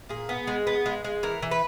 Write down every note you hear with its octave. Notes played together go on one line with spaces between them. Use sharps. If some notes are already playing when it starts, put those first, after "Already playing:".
A#2 G#4
B3
G#3
B3
G#3
G#3
E3 A#4
E3
B4